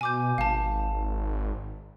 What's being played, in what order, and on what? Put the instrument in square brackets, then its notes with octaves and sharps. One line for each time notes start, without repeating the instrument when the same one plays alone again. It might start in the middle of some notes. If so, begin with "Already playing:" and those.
[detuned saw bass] B2 [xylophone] G#5 D6 G6
[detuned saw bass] G#1 [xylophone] F5 A5